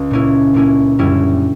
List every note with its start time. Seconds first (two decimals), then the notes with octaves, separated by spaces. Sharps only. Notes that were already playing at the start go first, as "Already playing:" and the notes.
Already playing: C#2
0.11 A#2 A#3 C#4 E4
0.54 A#2 A#3 C#4 E4
0.99 F#2 D3 G3 C#4 E4